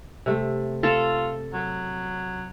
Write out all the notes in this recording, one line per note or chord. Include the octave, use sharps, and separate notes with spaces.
C3 A3
F4 A4
F#3